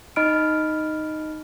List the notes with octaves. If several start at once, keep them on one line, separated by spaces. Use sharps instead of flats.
D#4 D#5 B5 F6 D7